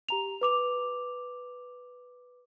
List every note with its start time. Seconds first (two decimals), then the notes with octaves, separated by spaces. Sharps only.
0.09 G4 A#5 F7
0.41 B4 D6 F7